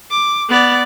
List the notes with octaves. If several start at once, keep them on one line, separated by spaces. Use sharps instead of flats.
D6
B3 D5